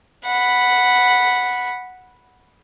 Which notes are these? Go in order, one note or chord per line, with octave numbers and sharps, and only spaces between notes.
F#5 B5